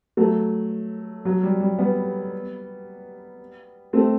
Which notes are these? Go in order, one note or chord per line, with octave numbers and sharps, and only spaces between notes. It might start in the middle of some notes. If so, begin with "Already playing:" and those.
F#3 A3
F#3
G3
G3
G3 B3
A3 C4